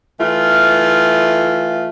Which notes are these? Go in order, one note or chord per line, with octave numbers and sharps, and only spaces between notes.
E3 A3 F4